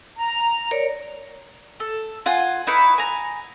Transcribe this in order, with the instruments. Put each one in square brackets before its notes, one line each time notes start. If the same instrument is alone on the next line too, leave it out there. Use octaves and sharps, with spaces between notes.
[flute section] A#5
[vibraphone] A#4 C#5 D5
[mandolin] A4
F4 F#5 G#5
D#4 E4 B4 C#6
G#5 A#5